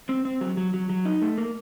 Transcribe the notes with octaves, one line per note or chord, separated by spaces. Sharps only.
C4
C4
F#3
F#3
F#3
F#3
D#4
A3
A#3